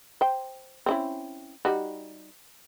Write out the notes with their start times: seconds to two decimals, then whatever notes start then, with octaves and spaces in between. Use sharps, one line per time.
0.21 C5 G5
0.86 C4 C#4 E4
1.65 G3 D#4 F#4